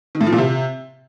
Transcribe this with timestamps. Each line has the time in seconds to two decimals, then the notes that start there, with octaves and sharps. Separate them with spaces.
0.15 D#3
0.21 A2
0.27 F3
0.32 A#2
0.38 C3